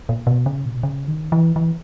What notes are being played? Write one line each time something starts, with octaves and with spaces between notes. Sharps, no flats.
A#2
B2
C#3
A#2
B2
C#3
D#3
E3
E3